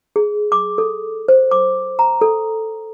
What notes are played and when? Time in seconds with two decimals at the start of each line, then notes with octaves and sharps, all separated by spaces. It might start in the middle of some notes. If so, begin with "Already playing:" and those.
0.16 G#4
0.52 D6
0.78 A4
1.28 C5
1.51 D6
1.99 A#5
2.21 A4